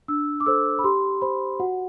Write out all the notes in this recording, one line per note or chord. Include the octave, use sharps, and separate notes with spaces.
D4 E6
D6
A4 C5 E6
B5
G4 C6
C5 B5
F#4 F#5